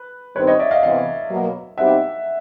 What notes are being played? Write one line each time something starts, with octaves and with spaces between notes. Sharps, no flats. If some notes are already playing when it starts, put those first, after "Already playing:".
Already playing: B4
G2 D#3 G3 C4 B4 C#5
C#5 D#5
D5 E5
D#5 F5
E2 C3 E3 D#5 F5
B2 F#3 A#3
B2 G3 C4 D#4 G4 E5 F#5